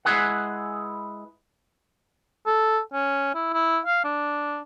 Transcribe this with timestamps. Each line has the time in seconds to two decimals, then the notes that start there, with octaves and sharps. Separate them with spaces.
0.05 G#3 E4 G#4 B4 F#5
2.46 A4
2.93 C#4
3.35 E4
3.54 E4
3.86 F5
4.04 D4